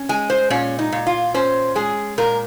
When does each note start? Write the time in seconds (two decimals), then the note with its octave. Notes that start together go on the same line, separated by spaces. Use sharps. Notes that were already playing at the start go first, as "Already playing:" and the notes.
Already playing: C#4
0.09 G#3 G#5
0.30 C5
0.50 A#2 C#4
0.79 D#4
0.92 A#2
1.07 F4
1.34 C#4 C5
1.75 G#3 G#4
2.18 A#2 A#4